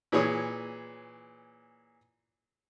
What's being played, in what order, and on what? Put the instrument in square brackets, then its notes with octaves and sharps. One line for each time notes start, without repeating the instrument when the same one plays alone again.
[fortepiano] A#2 E3 G#4 C#5 D#6